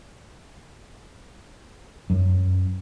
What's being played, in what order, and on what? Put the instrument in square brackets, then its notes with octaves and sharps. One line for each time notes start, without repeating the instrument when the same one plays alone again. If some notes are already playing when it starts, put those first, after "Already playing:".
[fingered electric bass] F#2